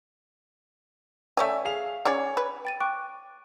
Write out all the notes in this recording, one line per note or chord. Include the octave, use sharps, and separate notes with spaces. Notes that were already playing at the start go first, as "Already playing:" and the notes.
A3 C#4 D5 E5 G#5
G#4 F5 F7
C#4 G#4 C#5 D5
B4
G5 A6 D#7
G5 C#6 D6 F#6